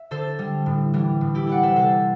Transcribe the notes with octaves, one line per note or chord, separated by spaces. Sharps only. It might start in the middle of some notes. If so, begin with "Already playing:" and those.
Already playing: E5
D3 A4 C5
G3
A2
E3 G3
A2
E4 G4
G3 D5 F#5
C5 E5
C3 A4 C5